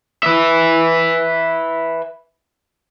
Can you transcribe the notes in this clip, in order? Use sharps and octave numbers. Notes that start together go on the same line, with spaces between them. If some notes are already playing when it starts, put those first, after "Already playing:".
B4 E5